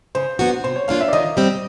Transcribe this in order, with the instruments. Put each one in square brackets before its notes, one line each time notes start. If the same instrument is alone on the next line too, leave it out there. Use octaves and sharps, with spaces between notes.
[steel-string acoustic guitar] C#3 [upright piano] C5
[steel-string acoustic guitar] F#3 B3 D4 F#4
[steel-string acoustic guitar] C3 [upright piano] C5
[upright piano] C#5
[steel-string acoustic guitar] F3 A#3 D4 F4 [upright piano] F5
[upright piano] E5
D5
[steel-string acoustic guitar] D#3 [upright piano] D#5
[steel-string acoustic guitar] G3 C4